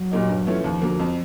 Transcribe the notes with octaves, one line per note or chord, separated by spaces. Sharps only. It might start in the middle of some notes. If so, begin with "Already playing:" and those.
Already playing: F#3
A#2 G3 A#3 D#4
G2
E3 A3 C#4 F4
D#2 F3
D3 F#3 A#3
F2